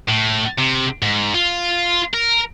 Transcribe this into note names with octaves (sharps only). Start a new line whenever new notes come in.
A2
C3
G#2
F4
A#4